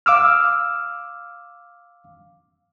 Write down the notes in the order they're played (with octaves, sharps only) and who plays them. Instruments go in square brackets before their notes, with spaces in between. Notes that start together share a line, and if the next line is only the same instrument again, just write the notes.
[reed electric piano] F5 D6 E6 F6